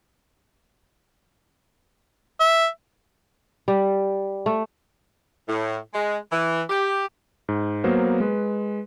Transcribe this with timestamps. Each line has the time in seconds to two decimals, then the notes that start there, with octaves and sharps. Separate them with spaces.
2.40 E5
3.68 G3
4.46 A3
5.48 A2
5.94 G#3
6.31 E3
6.69 G4
7.49 G#2
7.84 F#3 A#3 B3 A#4 C5
8.20 G#3 B4